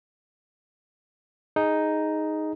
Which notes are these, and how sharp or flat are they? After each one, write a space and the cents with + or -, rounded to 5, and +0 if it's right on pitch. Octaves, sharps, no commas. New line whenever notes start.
D#4 +0 G#4 +0